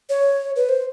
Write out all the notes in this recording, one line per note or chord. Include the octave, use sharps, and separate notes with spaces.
C#5
B4
C5